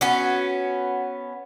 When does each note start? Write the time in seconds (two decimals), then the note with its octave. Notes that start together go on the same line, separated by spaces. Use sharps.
0.01 B3 C#4 F#4